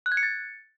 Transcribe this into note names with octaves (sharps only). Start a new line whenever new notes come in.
F#6
G#6
C#7
A6